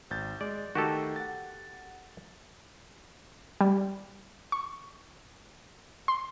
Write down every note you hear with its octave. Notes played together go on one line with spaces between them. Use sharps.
G#1 G6 A6
G#3 D5
D#3 A3 F#4 G4 A4 A5
F#5 A6
G3
C#6
C6